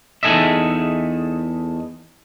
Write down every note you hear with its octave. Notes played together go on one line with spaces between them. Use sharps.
E2 D#4 G#4 A4 D#5 E5